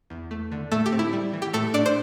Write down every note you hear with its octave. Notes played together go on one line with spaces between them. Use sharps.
E2
A3
D3
A2 A3 A4
G4
C4
E4
G3
E3
G4
A2 A3 A4
A2 D4 D5
C5